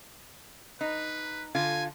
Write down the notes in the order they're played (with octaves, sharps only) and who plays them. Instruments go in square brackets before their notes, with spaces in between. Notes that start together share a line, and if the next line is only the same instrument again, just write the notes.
[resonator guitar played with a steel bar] D#4 [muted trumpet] B4
[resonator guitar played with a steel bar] D3 F4 [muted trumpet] G#5